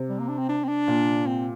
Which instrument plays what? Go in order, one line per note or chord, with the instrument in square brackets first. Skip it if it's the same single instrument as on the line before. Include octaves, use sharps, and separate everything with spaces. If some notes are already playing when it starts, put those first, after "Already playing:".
Already playing: [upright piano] C3
[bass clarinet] G3
A#3
D4
C4
D4
C4
D4
[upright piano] A#2
[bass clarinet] C4